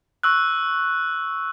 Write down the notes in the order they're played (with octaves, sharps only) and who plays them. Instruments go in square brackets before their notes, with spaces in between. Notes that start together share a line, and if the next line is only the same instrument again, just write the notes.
[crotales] C#6 E6 F#6